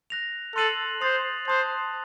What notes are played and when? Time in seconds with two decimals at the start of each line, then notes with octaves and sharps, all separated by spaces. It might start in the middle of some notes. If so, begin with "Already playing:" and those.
0.10 F#6 A#6 F7
0.56 A4 C6 F#6 C7 D#7 F#7
1.01 C5 D#6 A6 C7 F7
1.48 C5 A5 C6 D#6 F#6